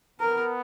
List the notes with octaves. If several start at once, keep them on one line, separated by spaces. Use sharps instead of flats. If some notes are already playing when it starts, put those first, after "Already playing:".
B3 A#4